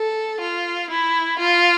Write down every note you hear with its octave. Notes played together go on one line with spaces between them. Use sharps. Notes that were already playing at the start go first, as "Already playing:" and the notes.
Already playing: A4
F4
E4
F4